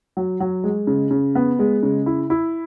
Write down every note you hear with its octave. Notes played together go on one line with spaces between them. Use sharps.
F#3
F#3
G#3
C#3
C#3
B3
G#3
C#3
E4
E4